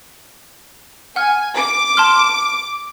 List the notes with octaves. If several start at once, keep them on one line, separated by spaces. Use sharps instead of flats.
F#5 G#5 F6
D6
A5 C6 F6